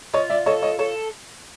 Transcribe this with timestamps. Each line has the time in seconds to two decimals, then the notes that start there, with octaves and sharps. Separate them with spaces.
0.14 F4 C#5 D#5
0.30 D5 E5
0.46 A4 C#5 D#5
0.62 C#5 D#5
0.79 A4 C#5